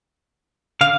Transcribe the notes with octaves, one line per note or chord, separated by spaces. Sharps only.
D3 F5